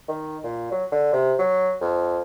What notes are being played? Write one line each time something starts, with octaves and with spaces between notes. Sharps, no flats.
D#3
A#2
F#3
D3
C3
F#3
F2